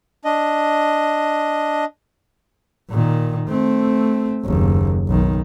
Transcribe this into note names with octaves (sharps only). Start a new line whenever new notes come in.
D4 D#5
A#2 D#3
A3 C4
F#1 D#2
B1 D#3